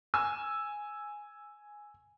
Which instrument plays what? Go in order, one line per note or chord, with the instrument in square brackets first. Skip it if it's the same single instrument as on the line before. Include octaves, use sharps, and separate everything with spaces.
[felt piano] G#5 E6